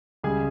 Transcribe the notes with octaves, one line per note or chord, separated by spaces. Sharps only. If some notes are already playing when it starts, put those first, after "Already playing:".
C#2 C#3 G3 G#4 G#5